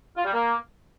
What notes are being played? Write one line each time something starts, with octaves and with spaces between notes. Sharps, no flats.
F4
G3
A#3